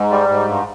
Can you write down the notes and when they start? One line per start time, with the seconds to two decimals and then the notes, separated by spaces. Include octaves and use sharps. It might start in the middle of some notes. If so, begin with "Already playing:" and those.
Already playing: G#2
0.11 G3
0.29 G#2
0.48 G2